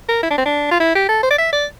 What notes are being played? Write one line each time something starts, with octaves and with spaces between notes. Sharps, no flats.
A#4
E4
D4
C4
D4
F4
E4
G4
A4
C5
D5
E5
D5